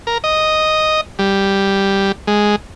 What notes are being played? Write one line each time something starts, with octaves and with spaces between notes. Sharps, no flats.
A#4
D#5
G3
G#3